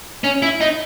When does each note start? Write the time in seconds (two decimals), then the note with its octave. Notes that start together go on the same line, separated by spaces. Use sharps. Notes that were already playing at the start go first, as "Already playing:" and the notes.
0.24 C#4
0.42 E4
0.61 D#4